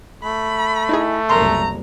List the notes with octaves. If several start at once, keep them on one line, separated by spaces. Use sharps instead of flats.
A3 B5
D#4 E4 G#4
F#1 C2 A#4 A#5 C6